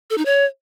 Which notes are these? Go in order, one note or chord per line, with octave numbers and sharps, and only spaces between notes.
A4
D#4
C#5